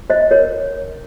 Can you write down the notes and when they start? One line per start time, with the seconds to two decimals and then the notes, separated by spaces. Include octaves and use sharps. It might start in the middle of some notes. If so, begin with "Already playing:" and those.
0.10 C5 D#5
0.31 A#4 C#5